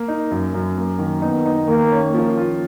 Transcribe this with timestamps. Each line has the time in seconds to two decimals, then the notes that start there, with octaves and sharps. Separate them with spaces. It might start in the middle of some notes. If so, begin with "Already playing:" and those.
Already playing: A#3
0.08 D#4
0.31 F#2
0.54 F#2
0.77 A#3
0.99 D#3
1.22 B3 D#4
1.46 D#4
1.68 D#3 A#3
1.92 C#4
2.14 F3 A#3
2.38 F4